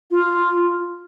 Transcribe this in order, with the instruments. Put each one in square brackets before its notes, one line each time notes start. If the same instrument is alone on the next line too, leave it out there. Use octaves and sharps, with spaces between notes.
[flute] F4